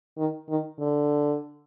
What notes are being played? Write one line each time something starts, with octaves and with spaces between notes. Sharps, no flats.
D#3
D#3
D3